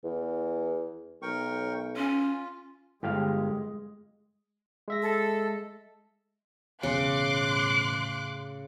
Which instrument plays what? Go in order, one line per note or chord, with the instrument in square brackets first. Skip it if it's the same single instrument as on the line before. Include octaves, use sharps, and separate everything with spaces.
[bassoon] E2
[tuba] B1 [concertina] A#4 G5 C#6
[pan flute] C#4 [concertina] F4
[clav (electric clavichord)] G1 G4 F5 [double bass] G#3
[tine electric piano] G#3 E5 A#6
[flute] A4
[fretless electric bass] E1 E2 [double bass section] A2 [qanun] C#3 [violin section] C6 D6 F#6